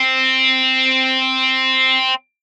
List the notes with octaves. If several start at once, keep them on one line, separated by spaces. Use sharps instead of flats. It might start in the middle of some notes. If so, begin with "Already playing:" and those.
Already playing: C4